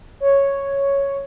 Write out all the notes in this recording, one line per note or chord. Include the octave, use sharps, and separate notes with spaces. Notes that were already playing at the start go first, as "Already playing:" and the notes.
C#5